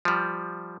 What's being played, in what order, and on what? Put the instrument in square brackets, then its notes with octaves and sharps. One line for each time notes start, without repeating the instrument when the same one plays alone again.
[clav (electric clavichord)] F3 G3